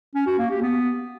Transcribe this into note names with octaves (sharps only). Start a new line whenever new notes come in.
C#4
F#4
A#3
G4
B3